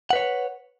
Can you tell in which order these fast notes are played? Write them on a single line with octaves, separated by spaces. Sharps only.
F#5 B4 C#5